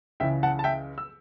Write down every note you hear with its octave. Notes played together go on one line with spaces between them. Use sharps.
C#2 C#3 E3 E5 G5
F#5 A5
A5
E5 G5
E6